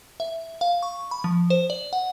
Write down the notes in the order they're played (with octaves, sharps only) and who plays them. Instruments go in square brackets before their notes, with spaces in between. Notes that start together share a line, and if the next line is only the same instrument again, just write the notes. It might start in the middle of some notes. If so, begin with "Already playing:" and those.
[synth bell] E5
F5
C#6
B5
F3
C5
D5
F#5